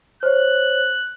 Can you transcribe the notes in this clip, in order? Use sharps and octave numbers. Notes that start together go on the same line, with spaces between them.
C5 C#5 F#6